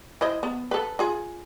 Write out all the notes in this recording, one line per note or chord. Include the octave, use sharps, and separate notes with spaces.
E4 C5 D#5
B3
A4 B4
F4 G#4